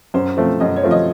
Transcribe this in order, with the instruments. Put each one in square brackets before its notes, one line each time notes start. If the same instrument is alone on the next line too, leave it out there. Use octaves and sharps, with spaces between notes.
[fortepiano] F#2 [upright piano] C5
[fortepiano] F3 A3 C4
[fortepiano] F#2 [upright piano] D#5
[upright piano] C#5
[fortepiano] F3 A3 C4
[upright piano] D#5